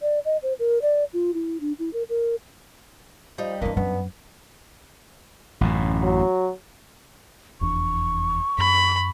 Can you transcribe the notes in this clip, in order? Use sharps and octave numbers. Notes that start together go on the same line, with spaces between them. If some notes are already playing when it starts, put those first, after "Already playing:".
D5
D#5
C5
A#4
D5
F4
E4
D4
E4
A#4
A#4
F3 G3 D#4
G2 E3 A#3 C4 B4 D#5
F#2 B3 C#4
A1 F#2 A2
F#3
F1 E2 D4 C#6
F#2 B5